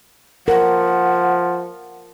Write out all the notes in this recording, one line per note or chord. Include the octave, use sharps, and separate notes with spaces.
F3 A#4 F#5